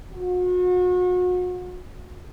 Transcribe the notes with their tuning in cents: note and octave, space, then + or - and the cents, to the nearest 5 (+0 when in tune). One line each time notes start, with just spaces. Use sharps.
F#4 -35